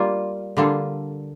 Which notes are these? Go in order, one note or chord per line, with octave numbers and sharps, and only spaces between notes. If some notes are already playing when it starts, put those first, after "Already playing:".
Already playing: G3 A#3 F4
D3 G3 A#3 F4 A4